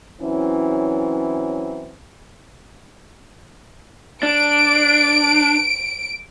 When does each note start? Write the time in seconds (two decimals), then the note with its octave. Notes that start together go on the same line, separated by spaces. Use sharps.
0.21 E3 F#3 C4 C#4 E4
4.23 D4 D7